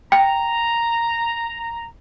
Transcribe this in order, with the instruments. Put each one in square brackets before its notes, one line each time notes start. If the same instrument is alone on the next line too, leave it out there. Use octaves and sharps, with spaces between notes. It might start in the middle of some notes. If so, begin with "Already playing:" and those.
[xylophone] G5 [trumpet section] A#5